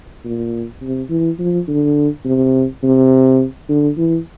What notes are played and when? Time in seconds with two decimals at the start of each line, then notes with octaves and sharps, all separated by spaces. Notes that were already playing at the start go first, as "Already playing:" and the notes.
0.24 A#2
0.82 C3
1.10 E3
1.39 F3
1.68 D3
2.25 C3
2.83 C3
3.69 D3
3.97 E3